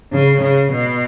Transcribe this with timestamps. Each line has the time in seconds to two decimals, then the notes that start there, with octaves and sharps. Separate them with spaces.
0.13 C#3
0.42 C#3
0.73 B2